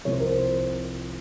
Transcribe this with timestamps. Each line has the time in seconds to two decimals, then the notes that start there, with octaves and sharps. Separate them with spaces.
0.05 C2 C3 F3 C#5
0.12 C5
0.20 A#4
0.26 C5